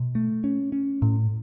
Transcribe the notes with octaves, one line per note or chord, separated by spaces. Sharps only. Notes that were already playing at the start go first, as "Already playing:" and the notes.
Already playing: B2
A3
C#4
C#4
A2